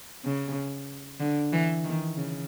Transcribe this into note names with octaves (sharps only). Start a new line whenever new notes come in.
C#3
D3
E3
D#3
C#3